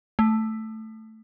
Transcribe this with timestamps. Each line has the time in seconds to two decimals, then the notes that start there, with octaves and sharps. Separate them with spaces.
0.19 A3